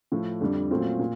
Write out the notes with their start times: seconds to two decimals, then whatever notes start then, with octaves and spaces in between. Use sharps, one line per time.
0.12 A2 F3 A3
0.41 F2 D3 G3
0.71 A#2 F#3 A3 C4 F4
0.99 A#2